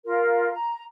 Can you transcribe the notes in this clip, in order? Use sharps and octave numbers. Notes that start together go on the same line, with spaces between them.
F4 A#4
A#5